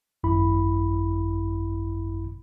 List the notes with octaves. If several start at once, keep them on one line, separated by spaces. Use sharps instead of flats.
G#1 F#2 E4 B5